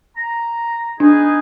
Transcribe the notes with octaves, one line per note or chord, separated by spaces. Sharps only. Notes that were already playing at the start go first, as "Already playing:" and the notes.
A#5
B3 D4 D#4 G#4